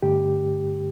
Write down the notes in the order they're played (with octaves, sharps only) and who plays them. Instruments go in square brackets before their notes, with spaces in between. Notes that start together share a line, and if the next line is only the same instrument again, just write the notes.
[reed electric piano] G2 D3 A3 G4